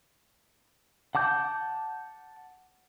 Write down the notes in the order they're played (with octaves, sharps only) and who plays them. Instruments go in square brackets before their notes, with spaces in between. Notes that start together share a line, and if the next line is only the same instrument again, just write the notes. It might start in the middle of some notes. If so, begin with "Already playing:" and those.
[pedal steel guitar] F#5 A5 D6 G6